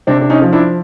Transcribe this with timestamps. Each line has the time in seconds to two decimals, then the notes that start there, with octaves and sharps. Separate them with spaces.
0.07 C3 C4 D4
0.21 D4
0.30 C#4 D#4
0.42 F3
0.52 D4 E4